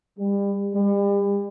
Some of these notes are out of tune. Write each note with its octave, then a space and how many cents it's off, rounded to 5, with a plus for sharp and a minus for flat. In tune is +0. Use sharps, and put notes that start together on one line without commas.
G3 +35
G3 +40